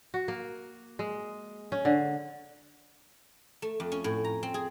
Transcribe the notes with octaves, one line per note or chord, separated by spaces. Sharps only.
F#4
A#3
G#3
C#4
D3
A3
F2
C#4
A2
A#5
C4
G#4